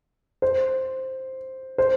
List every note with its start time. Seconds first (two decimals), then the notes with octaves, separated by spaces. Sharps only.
0.42 C5
1.78 C5